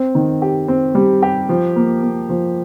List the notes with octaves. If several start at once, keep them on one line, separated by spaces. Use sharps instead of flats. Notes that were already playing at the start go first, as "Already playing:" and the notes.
Already playing: C4
D#3
G4
C4
G3
G4
F3
A#3
A#3
F3